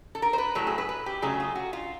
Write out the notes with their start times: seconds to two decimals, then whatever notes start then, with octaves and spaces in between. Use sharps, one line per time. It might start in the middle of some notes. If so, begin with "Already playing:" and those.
0.15 A4
0.22 A#4
0.33 C5
0.38 B4
0.55 A2 F#3 A3 A4
0.67 G#4
0.78 B4
0.89 B4
1.06 G4
1.22 C#3 F#3 A3 G#4
1.40 F4
1.55 F#4
1.73 F4